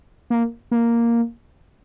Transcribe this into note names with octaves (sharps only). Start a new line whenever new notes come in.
A#3
A#3